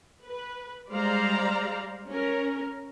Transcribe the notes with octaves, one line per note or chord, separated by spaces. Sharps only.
B4
G3 G#3 C5 D5 F5 A#5
C#4 A#4